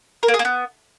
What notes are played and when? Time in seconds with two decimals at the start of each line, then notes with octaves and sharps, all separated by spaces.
0.23 A#4
0.28 A#3
0.34 G#4
0.39 A#3
0.45 B3